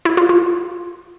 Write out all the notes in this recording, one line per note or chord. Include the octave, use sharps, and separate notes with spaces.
E4
F4
F4